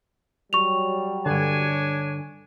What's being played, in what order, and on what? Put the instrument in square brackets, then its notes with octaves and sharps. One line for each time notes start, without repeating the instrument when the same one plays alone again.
[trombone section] F#3 G3 [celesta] C#6 F7
[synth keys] G2 D3 [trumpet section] D4 C#5 G#5